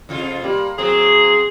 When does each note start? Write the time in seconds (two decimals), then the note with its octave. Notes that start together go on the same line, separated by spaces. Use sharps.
0.09 F2 C3 F4
0.44 G3 A#3
0.78 F#3 A#3 C4 G#4